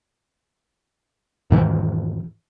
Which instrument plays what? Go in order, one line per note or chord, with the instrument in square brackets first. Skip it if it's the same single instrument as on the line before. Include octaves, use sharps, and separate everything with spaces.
[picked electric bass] E1 G#2 D#3 E3